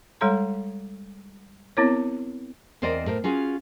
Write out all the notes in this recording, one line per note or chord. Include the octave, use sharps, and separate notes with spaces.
G3 G#3 A4 C#5 A#5 C6
B3 C4 E4 A#4 C#5
E2 C4 A#4 C5 D5 D#5
A2 A#4 C5
C#4 F4 F#4 G#4